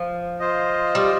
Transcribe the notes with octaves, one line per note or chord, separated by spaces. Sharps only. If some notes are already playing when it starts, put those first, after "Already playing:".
Already playing: F3
F4 C5 D#5
G3